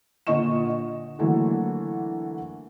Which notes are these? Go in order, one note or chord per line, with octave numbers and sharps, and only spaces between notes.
A#2 D3 D#5 C#6 E7
D#5
D3 E3 F#3 A3 A#3